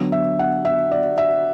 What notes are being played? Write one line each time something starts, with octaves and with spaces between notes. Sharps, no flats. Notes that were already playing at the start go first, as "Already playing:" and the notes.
Already playing: D3 F#3 B3
E5
F#5
E5
D5
E5